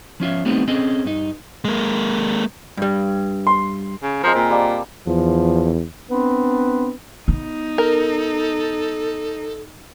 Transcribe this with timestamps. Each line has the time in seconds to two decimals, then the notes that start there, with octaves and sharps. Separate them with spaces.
0.20 F3 C#4 F4 E5
0.45 G3 A3 B3 C4 D#4
0.68 C4 C#4 G#4 A4 D#5
1.05 G2 D#4
1.65 G#3 A#3
2.77 G2 G3
3.47 C6
4.03 C#3
4.23 F3 G#3 C4 A#4
4.35 A#2
4.50 G3 A#3 A5
5.07 E2 F3
6.10 B3 C4 D4 B4
7.28 B3 D#4
7.78 A4 A#4